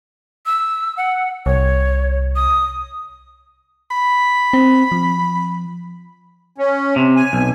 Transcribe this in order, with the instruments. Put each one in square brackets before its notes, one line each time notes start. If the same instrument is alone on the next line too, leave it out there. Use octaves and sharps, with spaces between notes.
[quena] E6
F#5
[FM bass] C2 [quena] C#5
[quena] D#6
[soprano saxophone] B5
[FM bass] C4
F3
[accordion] C#4
[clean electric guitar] C3
[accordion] G#5
[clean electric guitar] B1